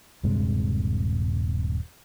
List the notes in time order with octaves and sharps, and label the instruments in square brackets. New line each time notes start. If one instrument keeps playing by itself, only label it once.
[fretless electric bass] D#1 G2 C3 G#3